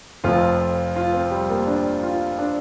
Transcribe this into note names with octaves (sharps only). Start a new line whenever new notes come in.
F1 F2 F3 F4
F4
C4
G3
A#3
D4
F4
D4